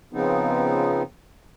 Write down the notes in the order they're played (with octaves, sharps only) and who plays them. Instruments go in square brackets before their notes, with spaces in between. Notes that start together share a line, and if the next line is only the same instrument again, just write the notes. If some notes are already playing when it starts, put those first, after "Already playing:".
[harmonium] C#3 F3 B3 C4 D#4